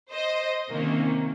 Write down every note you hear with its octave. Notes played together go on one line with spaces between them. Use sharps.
C5 D#5
C3 D#3 A#3 C#4